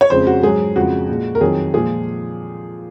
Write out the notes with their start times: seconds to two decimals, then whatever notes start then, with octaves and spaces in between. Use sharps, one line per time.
0.01 C#5
0.10 F2 C#3 G#3 C5
0.27 F#4
0.43 G#2 F#3 G#4
0.76 F2 C#3 F3 G#3 F#4
1.09 A#2 G#3
1.35 A#4
1.41 F2 D#3 F#3 G#4
1.74 A#2 F3 G#3 G#4